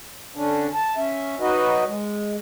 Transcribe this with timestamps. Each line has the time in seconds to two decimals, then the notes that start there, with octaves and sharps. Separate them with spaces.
0.36 D3 C#4 D4
0.74 A5
0.96 C#4 E5
1.40 F#3 D#4 F#4 B4 D#5
1.87 G#3